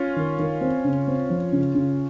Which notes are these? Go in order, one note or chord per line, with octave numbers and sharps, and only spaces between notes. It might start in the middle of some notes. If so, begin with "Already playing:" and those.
Already playing: C#4 F4
D#3
D#3
C4
C#3
C4
F3
C#3
C#3